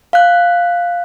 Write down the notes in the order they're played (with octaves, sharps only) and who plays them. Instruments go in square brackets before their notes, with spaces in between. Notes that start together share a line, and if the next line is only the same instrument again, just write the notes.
[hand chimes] F5 F#6